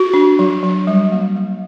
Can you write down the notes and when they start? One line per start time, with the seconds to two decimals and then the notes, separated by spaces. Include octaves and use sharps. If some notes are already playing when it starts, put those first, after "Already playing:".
Already playing: F#4
0.14 D4
0.39 F#3
0.63 F#3
0.87 G3
1.12 A#3
1.36 A#3